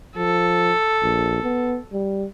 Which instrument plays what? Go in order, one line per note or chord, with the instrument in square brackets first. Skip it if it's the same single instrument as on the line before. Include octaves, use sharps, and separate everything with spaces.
[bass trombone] F3 [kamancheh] A4
[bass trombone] A#1
B3
G3